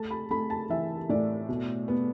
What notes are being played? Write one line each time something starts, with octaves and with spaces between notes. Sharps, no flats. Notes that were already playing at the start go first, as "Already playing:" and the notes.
Already playing: A3 A5
B5
A3 B5
A5
E3 E5
A2 D5
B2
B3